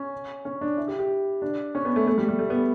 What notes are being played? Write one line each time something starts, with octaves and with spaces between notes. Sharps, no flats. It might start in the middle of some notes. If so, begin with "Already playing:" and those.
Already playing: C#4
C#4
D4
E4
G4
G4
D4
C#4
B3
A3
A3
G3
G3
A3
B3